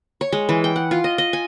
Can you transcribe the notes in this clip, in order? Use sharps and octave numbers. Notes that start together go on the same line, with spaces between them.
C#5
G#3
E3
G5
F#5
F4
D#5
D#5
G#5